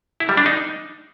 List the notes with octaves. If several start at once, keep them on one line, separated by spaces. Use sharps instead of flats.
E4
G3
D4
D#4